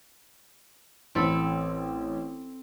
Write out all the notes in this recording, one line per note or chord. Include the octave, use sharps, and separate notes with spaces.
A1 C4 A4 B5